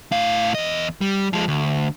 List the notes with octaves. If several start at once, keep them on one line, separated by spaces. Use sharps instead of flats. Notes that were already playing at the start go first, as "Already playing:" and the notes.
A2 F5
E2 D#5
G3
F3 G#3
D2